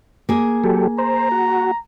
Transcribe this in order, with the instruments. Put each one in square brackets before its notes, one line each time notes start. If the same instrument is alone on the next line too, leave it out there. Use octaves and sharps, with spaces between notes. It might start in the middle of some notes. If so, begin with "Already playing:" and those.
[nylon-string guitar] A#3 G#4
[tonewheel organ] F#3 G4 A4
[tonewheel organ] C5 [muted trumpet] A#5
[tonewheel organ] F#4